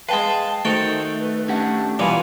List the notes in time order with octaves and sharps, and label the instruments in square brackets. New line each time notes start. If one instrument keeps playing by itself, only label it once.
[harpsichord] G#3 B4 [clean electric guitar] F5 G5 [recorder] A5
[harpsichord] D#3 F#4 G5 [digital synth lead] A3 [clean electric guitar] A4 [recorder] C5
[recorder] B4
[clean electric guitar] C#4 G4 F#5 [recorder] D4
[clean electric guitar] B1 [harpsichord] A#2 E3 G3 [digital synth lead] B3 [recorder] G#5